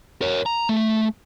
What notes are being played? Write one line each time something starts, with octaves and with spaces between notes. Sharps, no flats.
A#4 C#5
A#5
A3